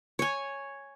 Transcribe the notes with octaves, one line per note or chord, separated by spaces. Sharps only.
C#5 G#5